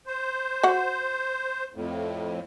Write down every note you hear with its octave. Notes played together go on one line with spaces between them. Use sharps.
C5
F#4 F#5
F2 A2